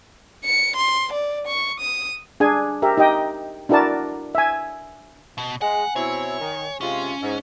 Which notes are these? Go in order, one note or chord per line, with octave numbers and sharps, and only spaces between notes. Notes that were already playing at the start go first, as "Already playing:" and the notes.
C#7
C6
D5
C#6
D#6
D4 G#4 G#5
G4 A#4 E5
D#4 G4 D#5 G5
D4 E4 F#4 A#4 D5 A5
E5 G#5
B2
G#3 F#5 G#5
B2 C4 E4 C#5
D#3
C3 G#3 C#4 F4
G#2